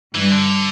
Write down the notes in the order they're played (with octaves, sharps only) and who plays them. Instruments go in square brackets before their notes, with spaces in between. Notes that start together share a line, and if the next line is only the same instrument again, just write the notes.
[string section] G2 [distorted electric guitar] E3
[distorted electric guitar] D3